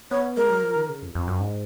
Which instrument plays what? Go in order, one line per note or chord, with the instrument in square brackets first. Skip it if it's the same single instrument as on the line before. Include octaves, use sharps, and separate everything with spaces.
[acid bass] B3 [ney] C#5
[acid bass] G#3 [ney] A#4
[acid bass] F#3
F3
D#3
C#3
F2
F2
F#2
G#2